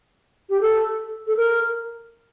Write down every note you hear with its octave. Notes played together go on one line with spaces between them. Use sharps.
G4
A4
A4
A#4